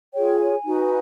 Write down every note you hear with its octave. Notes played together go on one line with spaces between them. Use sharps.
F4 G#4 C#5 G5
G#5
D#4 F#4 B4